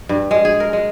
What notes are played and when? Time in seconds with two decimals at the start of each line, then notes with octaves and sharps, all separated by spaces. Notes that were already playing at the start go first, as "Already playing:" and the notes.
0.09 G2
0.31 G#3
0.45 G#4
0.60 A#4
0.73 G#3